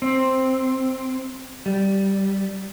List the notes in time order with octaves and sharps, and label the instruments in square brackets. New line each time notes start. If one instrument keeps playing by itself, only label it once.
[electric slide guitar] C4
G3